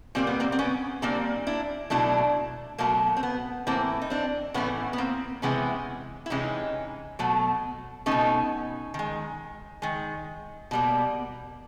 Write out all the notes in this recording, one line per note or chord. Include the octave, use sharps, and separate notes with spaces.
A#2 G3 A#3 C4
B3
A#3 C4
C4
B3 C#4
A#2 G3 A#3 C4 D4
D4 E4
B2 F#3 A3 D4 E4
B2 F#3 A3 A#3
C4
B3
A2 E3 A3 A#3 C4
D#4
C4 D4
A2 E3 A3 B3 C#4
B3
A#3 C4
C3 E3 G#3 B3 C#4
E4
C3 E3 G#3 C#4 D#4
B2 F#3 A3
F#3 A3 C#4 D#4
B2
D#3 G#3
D#3 G#3
B2 G3 A#3